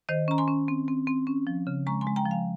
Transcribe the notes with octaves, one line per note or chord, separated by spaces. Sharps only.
D#3 C5 D#5
C#4 A#5
G#5 C6
C#4
C4
C4
C4
C#4
F3
C#3
G#3 A#5 C#6
G#5 C6
G#3
G5 A#5
F3
F5 G#5